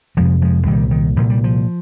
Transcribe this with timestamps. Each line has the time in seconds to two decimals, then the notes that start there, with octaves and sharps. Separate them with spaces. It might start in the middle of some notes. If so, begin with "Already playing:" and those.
0.17 F1 F2 C3 F3 G#3
0.42 F3 G#3
0.66 C2 A#2 D#3 G3
0.91 D#3
1.17 C2 A#2 F3
1.30 G3
1.44 F3